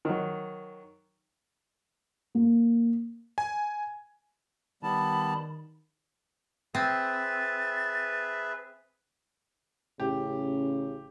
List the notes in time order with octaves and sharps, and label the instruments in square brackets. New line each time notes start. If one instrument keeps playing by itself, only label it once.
[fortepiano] D#3 F#3
[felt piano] A#3
[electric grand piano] G#5
[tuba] D#3 [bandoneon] G3 B3 A5 [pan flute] B5
[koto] C4 [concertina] G#4 B4 E5 [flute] A6
[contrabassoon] A1 [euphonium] C#3 [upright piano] G4